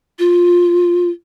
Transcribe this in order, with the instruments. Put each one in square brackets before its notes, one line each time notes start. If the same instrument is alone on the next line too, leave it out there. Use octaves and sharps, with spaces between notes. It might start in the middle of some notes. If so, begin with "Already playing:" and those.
[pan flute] F4